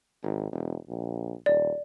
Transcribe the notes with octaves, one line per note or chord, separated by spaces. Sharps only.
G#1
E1
A#1
D#1 D5